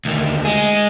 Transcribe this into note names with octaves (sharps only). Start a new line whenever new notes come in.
D2 D#3
G#3 G#4